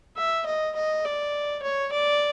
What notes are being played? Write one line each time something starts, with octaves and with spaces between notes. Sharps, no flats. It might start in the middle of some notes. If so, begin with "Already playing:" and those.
E5
D#5
D#5
D5
C#5
D5